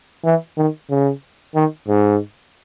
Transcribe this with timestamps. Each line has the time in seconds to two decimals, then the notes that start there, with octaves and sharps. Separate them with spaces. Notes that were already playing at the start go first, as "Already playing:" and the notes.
0.25 E3
0.57 D#3
0.90 C#3
1.55 D#3
1.88 G#2